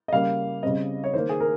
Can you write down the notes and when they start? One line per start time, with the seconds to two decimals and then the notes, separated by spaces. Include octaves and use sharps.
0.08 D#5
0.13 C#3 G3 A#3 F5
0.63 C#3 G3 C4 D#5
1.04 C#5
1.14 D#3 A#3 C5
1.29 G#4
1.40 A#4